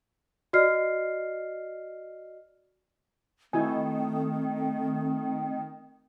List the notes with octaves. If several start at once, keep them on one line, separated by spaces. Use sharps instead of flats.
F#4 D5 D#5 F6 C7
D#3 A3 C4 E4 F#4 G#5